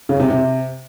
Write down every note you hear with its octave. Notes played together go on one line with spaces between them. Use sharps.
C#3
C3
C3